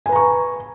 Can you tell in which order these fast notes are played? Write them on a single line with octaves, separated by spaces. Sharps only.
G#5 B4 A#5 C#6